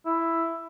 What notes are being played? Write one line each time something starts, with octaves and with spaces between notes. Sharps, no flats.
E4